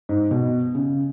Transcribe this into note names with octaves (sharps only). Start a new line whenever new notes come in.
G#2
B2
C#3